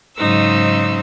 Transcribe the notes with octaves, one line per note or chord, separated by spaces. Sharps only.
G#2 C#3 F#3 D#4 C5 E6